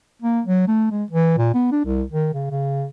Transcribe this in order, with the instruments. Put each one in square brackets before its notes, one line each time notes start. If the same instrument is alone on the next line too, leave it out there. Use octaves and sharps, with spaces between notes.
[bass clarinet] A#3
F#3
A3
G#3
E3
A#2
B3
D4
C2
D#3
C#3
C#3